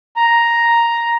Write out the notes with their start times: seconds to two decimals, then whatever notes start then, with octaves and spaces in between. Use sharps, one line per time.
0.16 A#5